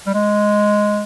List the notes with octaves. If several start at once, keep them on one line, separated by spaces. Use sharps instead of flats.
G3
G#3